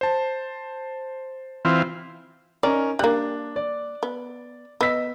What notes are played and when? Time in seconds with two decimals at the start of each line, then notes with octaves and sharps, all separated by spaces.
0.01 C5 A5
1.65 E3 C4 F4
2.63 C#4 D#4 A#4 D5
2.99 G3 A#3 D4 F#6
3.56 D5
4.03 B3
4.81 B3 D#5 E6 B6